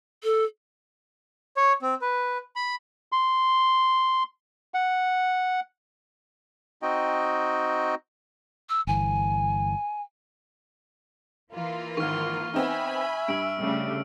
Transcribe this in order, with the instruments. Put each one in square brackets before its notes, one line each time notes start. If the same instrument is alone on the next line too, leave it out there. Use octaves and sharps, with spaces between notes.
[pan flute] A4
[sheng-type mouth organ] C#5
C4
B4
B5
[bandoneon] C6
F#5
C4 D#4 F#4 D#5 G5
[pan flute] E6
[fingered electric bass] G1 E3 [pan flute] G#5
[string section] E3 A#3 F4
[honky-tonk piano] G#1 D#3 [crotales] C#6 F6
[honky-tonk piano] B3 C4 D#4 [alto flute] E5 [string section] G#5 B5
[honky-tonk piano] G2 [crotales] E6 D7
[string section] C#3 G3 A3